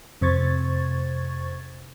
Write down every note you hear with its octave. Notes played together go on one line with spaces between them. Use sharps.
F2 C3 C5 C#6 G#6 A6